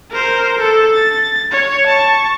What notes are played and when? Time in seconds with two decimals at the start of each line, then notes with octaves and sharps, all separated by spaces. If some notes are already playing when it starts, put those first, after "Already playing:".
0.11 A#4 C5
0.59 A4
0.94 A6
1.51 C#5
1.87 A5 C#6